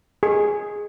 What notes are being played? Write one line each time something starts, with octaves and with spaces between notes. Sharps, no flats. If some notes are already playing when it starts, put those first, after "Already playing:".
G#4